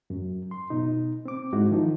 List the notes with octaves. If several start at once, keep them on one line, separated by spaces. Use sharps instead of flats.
F#2
C6
B2 D#4
C4 D6
G#2 G#3 D#4 E4 F#4
D#3 F3 D#4